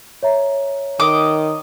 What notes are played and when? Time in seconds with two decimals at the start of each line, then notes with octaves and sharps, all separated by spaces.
0.23 C#5 E5 A#5
1.00 D#3 D#5 D6